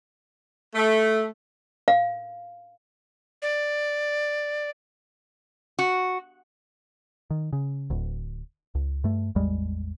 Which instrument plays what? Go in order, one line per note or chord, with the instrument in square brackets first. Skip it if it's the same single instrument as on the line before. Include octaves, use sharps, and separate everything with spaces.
[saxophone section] A3
[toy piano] F5
[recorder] D5
[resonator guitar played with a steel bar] F#4
[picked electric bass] D#3
C#3
D1 D2
C#2
G2 A3
A1 E2 G3 G#3